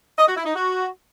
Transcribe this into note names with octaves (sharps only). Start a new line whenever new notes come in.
D#5
F#4
E4
D#4
F#4